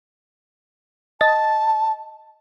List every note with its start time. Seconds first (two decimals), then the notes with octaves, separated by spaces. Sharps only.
1.21 D#5 A5 A6